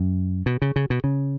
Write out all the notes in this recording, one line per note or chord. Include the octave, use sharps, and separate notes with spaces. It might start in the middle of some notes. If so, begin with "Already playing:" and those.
Already playing: F#2
B2
C#3
C#3
B2
C#3